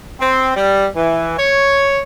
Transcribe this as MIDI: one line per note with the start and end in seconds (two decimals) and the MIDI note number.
0.20 0.53 60
0.56 0.86 55
0.95 1.34 52
1.38 2.01 73